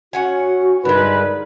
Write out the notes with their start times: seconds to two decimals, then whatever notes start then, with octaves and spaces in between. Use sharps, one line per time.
0.13 C#4 F#4 F#5 G#5
0.85 G2 D3 G#3 D#4 A#4 B4